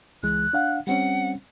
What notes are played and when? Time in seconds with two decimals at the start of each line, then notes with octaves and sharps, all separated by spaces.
0.23 C#2 E3 G#3 F#6
0.53 D4 F5 F#5
0.87 G3 C4 C#4 F#5